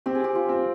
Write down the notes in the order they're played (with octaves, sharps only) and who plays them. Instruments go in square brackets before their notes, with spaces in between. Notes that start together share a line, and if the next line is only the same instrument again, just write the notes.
[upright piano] C4 [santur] G4
[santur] G#4
G4
F4
[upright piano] C4